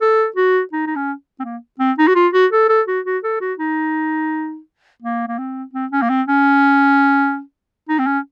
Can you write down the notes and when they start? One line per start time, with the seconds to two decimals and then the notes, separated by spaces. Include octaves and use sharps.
0.01 A4
0.36 F#4
0.73 D#4
0.87 D#4
0.96 C#4
1.40 C4
1.44 A#3
1.79 C4
1.98 D#4
2.08 F#4
2.15 F4
2.33 F#4
2.52 A4
2.69 A4
2.88 F#4
3.05 F#4
3.24 A4
3.41 F#4
3.59 D#4
5.02 A#3
5.28 A#3
5.39 C4
5.73 C4
5.92 C#4
6.02 A#3
6.09 C4
6.28 C#4
7.89 D#4
7.99 C4
8.06 C#4